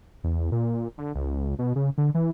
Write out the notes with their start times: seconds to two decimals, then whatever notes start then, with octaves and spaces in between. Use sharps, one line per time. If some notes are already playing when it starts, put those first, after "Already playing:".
0.24 E2
0.52 A#2
0.98 D3
1.15 C#2
1.59 B2
1.76 C#3
1.98 D3
2.14 E3